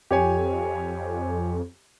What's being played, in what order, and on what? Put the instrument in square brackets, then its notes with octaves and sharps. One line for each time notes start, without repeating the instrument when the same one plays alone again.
[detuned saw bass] F2 [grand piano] G4 C#5 G#5